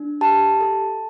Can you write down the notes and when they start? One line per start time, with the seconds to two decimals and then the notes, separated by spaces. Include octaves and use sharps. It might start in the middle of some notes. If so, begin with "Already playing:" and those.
Already playing: D4
0.21 G4 A5
0.61 A4